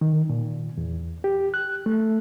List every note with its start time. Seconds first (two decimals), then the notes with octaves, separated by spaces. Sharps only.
0.01 D#3
0.29 A#2
0.78 E2
1.24 G4
1.54 F#6
1.86 A3